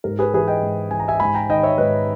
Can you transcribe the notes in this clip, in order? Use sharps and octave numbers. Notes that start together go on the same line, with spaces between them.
G#2 A#4
G#4 B4
E3 G#4 B4
D#5 G5
G#2
E3 G#5
A#5
E5 G#5
G#2 G#5 B5
G5 A#5
D#3 D#5 G5
C#5 E5
G#2 B4 D#5